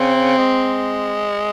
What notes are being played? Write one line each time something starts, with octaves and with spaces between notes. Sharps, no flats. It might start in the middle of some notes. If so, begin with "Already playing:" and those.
Already playing: C#3 C4
G#3